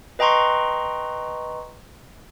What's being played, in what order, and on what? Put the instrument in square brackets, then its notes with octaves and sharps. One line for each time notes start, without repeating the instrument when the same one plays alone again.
[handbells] B4 D#5 G5 A#5 C6 C#6